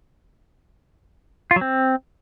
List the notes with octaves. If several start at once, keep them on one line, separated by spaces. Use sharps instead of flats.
F4
F#3
C4